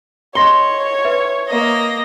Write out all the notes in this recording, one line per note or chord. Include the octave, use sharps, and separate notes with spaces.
C#5 D#5 C6 A#6 G7
B4 E5
A#3 D#5